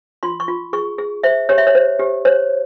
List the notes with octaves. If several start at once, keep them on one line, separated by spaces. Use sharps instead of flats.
F4 C6
C#6
F4
G#4 C#6
G#4
C5 E5
G4 C#5
E5
C#5
C5
G4
C5 C#5